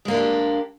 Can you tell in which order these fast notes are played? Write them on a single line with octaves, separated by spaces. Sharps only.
G#3 A#3 D4 E4 G4